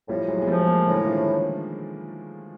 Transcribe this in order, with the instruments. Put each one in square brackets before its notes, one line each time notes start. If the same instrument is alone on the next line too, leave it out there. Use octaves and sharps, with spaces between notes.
[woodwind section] A2 [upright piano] F3 G3
[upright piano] F#3 G#3
G#3
[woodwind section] F3 [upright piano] G3 A3
[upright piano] G#3 A#3
[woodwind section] A2 [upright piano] D3 E3
[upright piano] D#3 F3